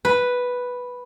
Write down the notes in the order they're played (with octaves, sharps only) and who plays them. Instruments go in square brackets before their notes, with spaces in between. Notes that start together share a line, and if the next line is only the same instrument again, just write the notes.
[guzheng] B4